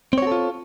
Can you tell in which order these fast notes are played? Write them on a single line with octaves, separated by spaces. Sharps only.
C4 C#5 F#4 A4 F4